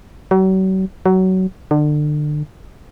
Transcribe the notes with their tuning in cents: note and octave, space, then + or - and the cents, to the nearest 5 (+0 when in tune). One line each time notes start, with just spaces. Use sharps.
F#3 +40
F#3 +20
D3 +30